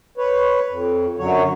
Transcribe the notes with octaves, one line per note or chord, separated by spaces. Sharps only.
B4 C#5
F2
F#2 D3 F#3 C#5